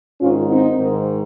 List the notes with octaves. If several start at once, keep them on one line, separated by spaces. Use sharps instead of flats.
G#2 D#3 C#4 F4
C4 D#4
G#2 D#3